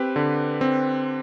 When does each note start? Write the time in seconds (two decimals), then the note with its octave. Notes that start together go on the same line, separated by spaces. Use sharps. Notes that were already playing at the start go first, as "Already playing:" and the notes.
Already playing: C4 G4 B4
0.16 D3
0.61 C4